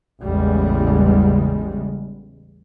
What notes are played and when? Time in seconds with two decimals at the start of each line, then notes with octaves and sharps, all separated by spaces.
0.24 A1 E2 C#3 G3 G#3